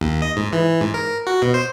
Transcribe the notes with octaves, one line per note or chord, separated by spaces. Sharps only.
D#2
D#5
G#2
E3
G#2
A#4
F#4
B2
C5